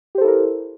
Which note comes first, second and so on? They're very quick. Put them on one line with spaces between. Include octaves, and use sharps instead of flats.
G4 C5 A4 E4 A#4